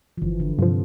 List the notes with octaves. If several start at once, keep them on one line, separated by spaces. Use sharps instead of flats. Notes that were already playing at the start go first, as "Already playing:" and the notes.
F3
G1 E3
D3
G2 C3 F3